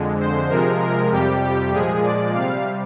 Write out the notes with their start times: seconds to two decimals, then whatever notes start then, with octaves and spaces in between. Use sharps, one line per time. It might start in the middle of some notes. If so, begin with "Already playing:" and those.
Already playing: F2 D3 G#3
0.19 C5
0.50 C3 F3 G#3 A#4
0.80 A#4
1.11 F2 C3 G3 G4
1.42 G4
1.73 A#2 F3 G#3 G#4
2.03 D5
2.34 C3 G3 F5